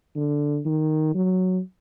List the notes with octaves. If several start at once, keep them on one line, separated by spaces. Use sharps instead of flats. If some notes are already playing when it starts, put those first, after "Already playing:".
D3
D#3
F#3